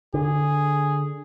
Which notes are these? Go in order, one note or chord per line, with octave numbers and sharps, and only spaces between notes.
D3 G#4